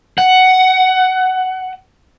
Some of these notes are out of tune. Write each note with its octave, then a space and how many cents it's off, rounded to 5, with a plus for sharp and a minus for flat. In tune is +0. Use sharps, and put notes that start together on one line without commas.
F#5 +10